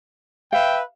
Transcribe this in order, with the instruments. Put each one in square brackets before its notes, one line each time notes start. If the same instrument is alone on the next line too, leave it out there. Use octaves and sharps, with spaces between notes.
[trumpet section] B4 E5 G5 [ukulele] F5